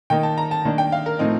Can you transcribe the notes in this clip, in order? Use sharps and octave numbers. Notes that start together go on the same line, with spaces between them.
D#3 A#3 D#4 G5
A5
A#5
A5
D#3 A#3 D4
G5
F5
A#4
A2 F3 C4 D#4